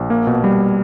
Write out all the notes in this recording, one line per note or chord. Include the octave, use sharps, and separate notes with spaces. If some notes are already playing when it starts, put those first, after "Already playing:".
Already playing: A#1
A#3
B2
G3